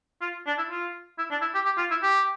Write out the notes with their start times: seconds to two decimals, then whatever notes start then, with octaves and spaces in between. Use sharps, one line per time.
0.22 F4
0.47 D4
0.58 E4
0.70 F4
1.18 E4
1.31 D4
1.42 E4
1.55 G4
1.66 G4
1.78 F4
1.91 E4
2.02 G4